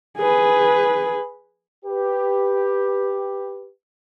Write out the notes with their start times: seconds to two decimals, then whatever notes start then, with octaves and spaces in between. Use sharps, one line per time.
0.18 G#4 B4
1.85 G4 B4